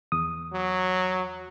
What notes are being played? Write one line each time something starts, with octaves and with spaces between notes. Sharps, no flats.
E2 D#6
F#3